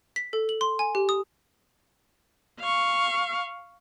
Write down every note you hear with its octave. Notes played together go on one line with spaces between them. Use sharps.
B6
A4
F#7
C6
G#5
G4
D#6
F5 C#6